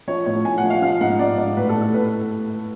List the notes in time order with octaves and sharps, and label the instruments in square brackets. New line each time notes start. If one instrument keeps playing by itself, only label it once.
[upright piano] F3 C#5
A2 C#5
A2 G#5
F#5
F3
F5
F3 F5
G#2 F#5
G#2 D5
G#2 D5
A2 B4
A4
A2
A4
A2 B4